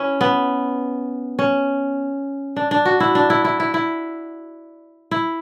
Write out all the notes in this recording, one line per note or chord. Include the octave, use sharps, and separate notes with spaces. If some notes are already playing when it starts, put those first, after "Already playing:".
Already playing: C#4 E4
B3
C#4
D4
D4
F#4
E4
D4
E4
E4
E4
E4
E4